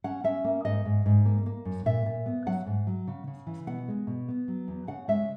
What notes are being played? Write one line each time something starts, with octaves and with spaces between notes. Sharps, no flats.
C#4 F#5
C#4 E5
A#3
G#2 D#5
G#2
G#2
A#3
A#3
F#2
A#2 E5
A#2
B3
F#3 F#5
G#2
F#3
C#3
C#3
E3
B2 F#5
G#3
B2
B3
F#3
E2
C#3 F#5
G#3 E5